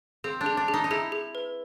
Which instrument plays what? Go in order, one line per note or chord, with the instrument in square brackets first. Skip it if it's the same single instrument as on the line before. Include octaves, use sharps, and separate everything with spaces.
[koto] C4 [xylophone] G#4
[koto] D4
[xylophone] G#4
[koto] D4
[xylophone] G#4
[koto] D#4
D#4
[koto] E4 [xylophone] G#4
[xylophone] G#4
B4